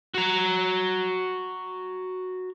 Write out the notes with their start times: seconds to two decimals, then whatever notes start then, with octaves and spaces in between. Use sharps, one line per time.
0.14 F#4 A#5